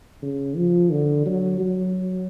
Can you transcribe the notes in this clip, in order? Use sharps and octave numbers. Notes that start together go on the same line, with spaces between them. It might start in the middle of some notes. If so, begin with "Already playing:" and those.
C#3
F3
D3
F#3
F#3